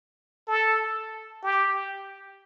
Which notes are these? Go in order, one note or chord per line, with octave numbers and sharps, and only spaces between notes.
A4
G4